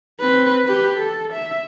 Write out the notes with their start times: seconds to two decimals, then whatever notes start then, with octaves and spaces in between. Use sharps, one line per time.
0.20 C4 B4
0.65 G4 B4
0.97 A4
1.33 E5